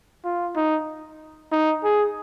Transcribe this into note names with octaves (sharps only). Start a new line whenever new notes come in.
F4
D#4
D#4
G#4